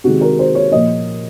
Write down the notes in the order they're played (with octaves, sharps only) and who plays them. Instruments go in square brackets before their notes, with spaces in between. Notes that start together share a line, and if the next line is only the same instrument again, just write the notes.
[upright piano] C3 D#3 G#3 F#4
A#4
C5
C#5
A#2 F3 A#3 D#5